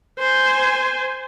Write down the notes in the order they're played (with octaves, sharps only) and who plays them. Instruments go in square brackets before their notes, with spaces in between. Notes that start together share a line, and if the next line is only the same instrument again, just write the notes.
[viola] C5 G#5